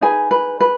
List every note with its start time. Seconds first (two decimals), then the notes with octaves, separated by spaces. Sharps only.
0.01 D#4 G#4 B4 G#5
0.31 B4
0.60 B4